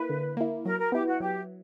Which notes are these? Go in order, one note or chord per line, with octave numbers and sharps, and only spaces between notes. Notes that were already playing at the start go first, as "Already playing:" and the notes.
Already playing: A#3 E4 B4
D3
A#3 E4
F#3 A#4
A#4
B3 E4 G4
F#4
F#3 G4